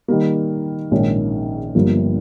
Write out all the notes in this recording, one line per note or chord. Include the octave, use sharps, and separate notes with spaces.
D#3 G3 A#3
A#1 G#2 D#3 A#3 C#4
G1 G2 F3 A#3